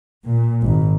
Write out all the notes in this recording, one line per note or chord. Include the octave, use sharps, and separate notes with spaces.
A#2
G#1